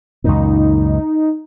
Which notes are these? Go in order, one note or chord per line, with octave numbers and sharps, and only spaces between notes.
C#2 F#2 A#2 D#4